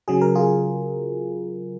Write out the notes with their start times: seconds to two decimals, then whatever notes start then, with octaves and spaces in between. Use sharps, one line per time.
0.08 C#3 F#3 G#4
0.21 A#4
0.35 F4 G#4